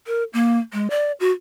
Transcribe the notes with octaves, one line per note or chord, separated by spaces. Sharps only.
A#4
A#3
G#3
D5
F#4